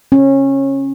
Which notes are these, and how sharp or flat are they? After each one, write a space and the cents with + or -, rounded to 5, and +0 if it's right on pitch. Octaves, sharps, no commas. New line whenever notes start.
C#4 -25